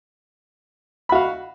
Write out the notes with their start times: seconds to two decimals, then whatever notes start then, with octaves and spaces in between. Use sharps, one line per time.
1.09 B5
1.12 F#4
1.15 F5